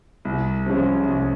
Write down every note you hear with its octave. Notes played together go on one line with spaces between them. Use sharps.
C2
C3 F3 G#3 C#4
C2